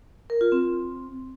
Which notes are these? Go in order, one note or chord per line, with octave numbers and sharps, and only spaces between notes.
A#4
F4
C4